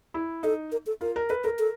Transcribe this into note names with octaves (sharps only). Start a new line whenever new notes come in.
E4
D#4 A4
A#4
A4
F4 A#4
A#4
A4 B4
A4 A#4
A4